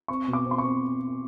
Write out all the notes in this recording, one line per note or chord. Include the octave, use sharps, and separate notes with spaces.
C4 C#6
B2
D6
C4
C6
C#6
C4